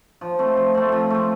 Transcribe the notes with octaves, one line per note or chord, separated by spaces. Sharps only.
F3
A3 C4
F3
A3 C4
F3
A3 C4